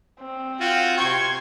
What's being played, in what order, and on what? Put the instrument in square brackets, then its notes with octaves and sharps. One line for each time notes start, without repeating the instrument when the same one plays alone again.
[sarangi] C4
[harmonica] F4 F#4 [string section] G5
[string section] C3 C6 G#6 [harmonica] G5 C#6